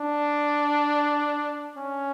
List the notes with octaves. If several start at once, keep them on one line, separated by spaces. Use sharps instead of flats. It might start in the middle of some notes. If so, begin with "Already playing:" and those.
Already playing: D4
C#4